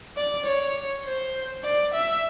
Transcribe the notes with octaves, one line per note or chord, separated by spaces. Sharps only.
D5
C#5
C5
D5
E5